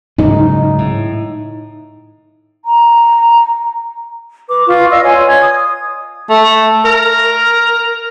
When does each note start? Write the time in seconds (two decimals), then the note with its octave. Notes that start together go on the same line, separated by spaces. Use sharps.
0.19 G#2 C#3 F#3 D#4
0.78 A2
2.65 A#5
4.49 B4 D6
4.67 F4 B4 C#6
4.90 D5 D#5 F5 E6
5.04 C#5 G#5 C6
5.26 G#6
5.41 D#6
6.30 A3
6.85 A#4